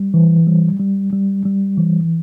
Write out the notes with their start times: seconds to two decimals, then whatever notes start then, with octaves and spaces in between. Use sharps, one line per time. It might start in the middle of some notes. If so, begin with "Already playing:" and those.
Already playing: G3
0.14 E3
0.47 G3
0.80 G3
1.13 G3
1.46 G3
1.78 E3